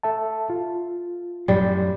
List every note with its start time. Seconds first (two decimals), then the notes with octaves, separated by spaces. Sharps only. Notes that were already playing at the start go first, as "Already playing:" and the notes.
0.03 A4 E5 A5
0.50 F4
1.48 F#2 A2 F#3 G3